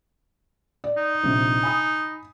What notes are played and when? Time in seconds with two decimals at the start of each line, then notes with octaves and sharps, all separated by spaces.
0.84 D5
0.97 D#4
1.24 A#1 C3
1.63 G#5 B5 D#6